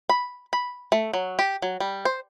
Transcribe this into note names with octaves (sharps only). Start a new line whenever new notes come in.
B5
B5
A3
F#3
G4
F#3
G3
C5